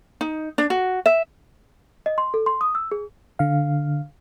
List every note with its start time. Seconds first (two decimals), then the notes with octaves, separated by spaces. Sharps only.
0.21 D#4
0.58 D4
0.70 F#4
1.06 E5
2.06 D#5
2.18 C6
2.34 A4
2.46 C6
2.61 D#6
2.75 E6
2.92 G#4
3.39 D3 F5